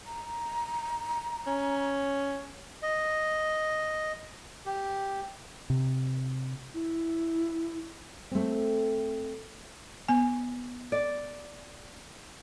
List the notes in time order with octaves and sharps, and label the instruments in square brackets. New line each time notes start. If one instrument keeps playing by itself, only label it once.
[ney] A#5
[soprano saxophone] C#4
[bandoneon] D#5
G4
[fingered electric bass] C3
[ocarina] E4
[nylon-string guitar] A3 C4
[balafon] B3 G#5
[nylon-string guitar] D5